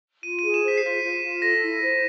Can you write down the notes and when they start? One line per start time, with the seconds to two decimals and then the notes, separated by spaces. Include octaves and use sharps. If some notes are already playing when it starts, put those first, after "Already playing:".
0.23 F4 D#7
0.39 G#4 D#7
0.54 E7
0.64 C5 B6
0.77 C7
0.83 F4 B6
1.03 F4
1.23 F4
1.42 A4 A#6
1.62 E4
1.82 C5